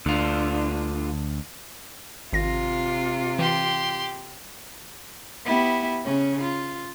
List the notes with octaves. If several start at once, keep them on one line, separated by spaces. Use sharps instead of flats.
D2 D3 D4 F4
G#1 C3 F4 A#6
E3 G4 C6
B3 E4 G4
C#3 C#4
F4